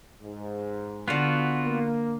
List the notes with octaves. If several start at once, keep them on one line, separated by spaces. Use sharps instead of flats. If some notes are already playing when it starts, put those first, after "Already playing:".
G#2
D3 B3 F4 F#4 F5
A#3